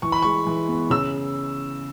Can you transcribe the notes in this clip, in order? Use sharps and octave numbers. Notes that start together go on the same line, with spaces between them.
E3 C#6
B5
G#3 C#6
E3
B3
C#3 E6